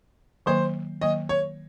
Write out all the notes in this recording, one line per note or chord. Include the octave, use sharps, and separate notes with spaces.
D#3 F#3 A#3 C5
D#3 F#3 A#3 D#5
C#5